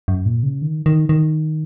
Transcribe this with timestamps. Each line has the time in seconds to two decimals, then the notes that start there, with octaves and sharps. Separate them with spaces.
0.08 F#2
0.26 A#2
0.43 C#3
0.62 D#3
0.86 D#3
1.09 D#3